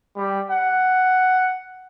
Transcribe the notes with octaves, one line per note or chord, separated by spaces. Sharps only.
G3
F#5